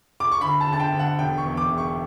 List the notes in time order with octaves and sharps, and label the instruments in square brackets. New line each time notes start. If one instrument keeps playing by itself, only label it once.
[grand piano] D6
C#6
D2 B5
A5
D3
A5
G5
D2
F#5
E1 G5
C#6
E2
D6
E1
C#6